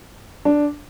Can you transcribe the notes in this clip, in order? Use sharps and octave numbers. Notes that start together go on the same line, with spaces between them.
D4